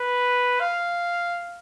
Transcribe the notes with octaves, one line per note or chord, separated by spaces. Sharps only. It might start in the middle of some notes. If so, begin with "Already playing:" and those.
Already playing: B4
F5